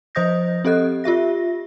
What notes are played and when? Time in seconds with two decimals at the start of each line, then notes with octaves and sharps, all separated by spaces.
0.15 F3 C5 D#5 D#6 G6 A#6
0.65 C4 G4 A4 D#5 F#6
1.04 F4 G4 E5 A#6